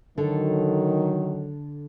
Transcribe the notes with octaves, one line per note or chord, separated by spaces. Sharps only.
D3 D#3 F#3 A4